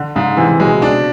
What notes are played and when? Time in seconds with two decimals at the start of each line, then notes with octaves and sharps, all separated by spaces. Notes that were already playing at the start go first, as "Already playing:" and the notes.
Already playing: D3
0.15 G#2 C#3
0.37 C3 E3
0.60 B2 G#3
0.82 D4